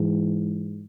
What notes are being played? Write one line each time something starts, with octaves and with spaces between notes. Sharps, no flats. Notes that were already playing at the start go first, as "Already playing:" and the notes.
Already playing: G#2 E3